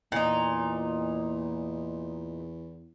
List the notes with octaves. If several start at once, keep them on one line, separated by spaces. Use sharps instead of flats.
E2 A#2 D#4